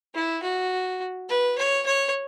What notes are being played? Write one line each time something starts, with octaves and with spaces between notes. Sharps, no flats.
E4
F#4
B4
C#5
C#5